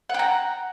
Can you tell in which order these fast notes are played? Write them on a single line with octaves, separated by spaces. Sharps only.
F#5 G5 A#5